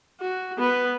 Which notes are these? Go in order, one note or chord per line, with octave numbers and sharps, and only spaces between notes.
F#4
B3 B4